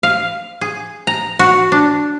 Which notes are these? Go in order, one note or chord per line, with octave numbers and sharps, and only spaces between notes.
F5
G#4
A#5
F#4
D4